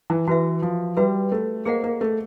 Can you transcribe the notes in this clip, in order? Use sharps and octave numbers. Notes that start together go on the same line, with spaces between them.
E3
E3 F#4 B4 E5
F3
G3 F#4 B4 E5
A3
A#3 G#4 C5 D#5 F#5
A#3
A3